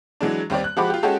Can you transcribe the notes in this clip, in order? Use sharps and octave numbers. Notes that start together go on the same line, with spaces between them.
E3 F#3 G#3 D4
D#2 G3 C4 G4 C#5 D5
F#6
F3 G#3 F#4 G4 B5 D6
F4 G4
G#3 C#4 F#4 G4 A4